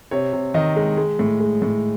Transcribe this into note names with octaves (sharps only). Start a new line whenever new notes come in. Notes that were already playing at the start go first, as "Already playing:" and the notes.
C3 C#5
C3
D#3 D#5
G#3
G#3
A2
G#3
A2